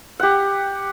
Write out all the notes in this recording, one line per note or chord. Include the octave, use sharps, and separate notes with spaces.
G4 F#5